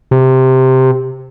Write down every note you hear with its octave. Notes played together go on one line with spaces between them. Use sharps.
C3